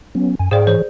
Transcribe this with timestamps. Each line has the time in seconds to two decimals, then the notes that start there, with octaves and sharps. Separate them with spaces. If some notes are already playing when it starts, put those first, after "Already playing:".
0.15 F#3 B3 C#4
0.39 F#2 G#5
0.51 G#2 G#4 C5 D5 F5 G5
0.67 E3 G#4 C5 C#5